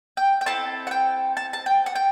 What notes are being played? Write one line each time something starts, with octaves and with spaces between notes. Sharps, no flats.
G5
G5
C4 E4 A4 A5
F#5
G5
A5
A5
G5
F#5
G5